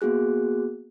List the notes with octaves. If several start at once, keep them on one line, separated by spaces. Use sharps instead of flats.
A#3 B3 F#4 G#4 F#6